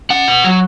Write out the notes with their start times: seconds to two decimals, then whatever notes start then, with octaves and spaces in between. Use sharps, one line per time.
0.10 C#4 F#5
0.28 B2
0.44 F#3